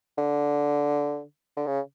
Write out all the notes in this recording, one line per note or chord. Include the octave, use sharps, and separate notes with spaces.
D3
D3
C#3